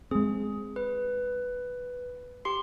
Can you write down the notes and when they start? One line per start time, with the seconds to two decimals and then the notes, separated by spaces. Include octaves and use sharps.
0.11 G#3 C4 G#4
0.76 B4
2.45 G4 C6 C7